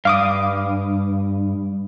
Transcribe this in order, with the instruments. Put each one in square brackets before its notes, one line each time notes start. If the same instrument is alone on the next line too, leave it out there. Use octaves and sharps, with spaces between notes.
[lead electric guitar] G2 [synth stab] F5 D6 D#6